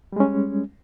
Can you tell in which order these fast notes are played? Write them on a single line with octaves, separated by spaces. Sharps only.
G3 G#3 C#4